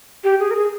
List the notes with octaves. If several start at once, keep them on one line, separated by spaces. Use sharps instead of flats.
G4
G#4
A#4
G#4